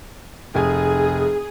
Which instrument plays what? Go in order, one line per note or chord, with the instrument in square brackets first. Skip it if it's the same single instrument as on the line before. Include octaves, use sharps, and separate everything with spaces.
[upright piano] F1 G#5 [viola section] G#4